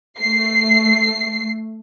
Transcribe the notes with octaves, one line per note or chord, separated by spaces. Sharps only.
A3 C7